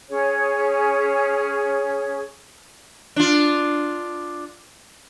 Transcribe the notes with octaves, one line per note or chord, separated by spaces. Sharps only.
C#4 G#4 C#5
D4 F4